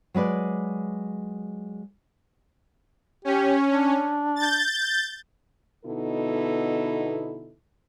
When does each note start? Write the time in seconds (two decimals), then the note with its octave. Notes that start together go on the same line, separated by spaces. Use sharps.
0.14 F#3 G#3 B4 D5
3.25 C#4 G4
3.66 D4
4.36 G6 A6
5.85 B2 D3 B3 D#4 E4 A4